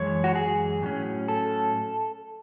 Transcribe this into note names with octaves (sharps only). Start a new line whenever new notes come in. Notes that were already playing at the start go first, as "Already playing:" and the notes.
Already playing: F#2 E3 G#3 C#5
F#4
G#4
A2 F#3 C#4
A4